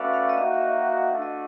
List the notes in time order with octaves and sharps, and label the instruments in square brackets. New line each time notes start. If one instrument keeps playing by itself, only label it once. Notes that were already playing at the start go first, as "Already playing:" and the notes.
Already playing: [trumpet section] A3 C#4 F#4 B4 D5 [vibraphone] E5 F5
[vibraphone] F5
D#5
[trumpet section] A#3 D#4 F#4 [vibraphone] E5
[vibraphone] D#5
E5
B4
[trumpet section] A3 D4 F#4
[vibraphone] D#5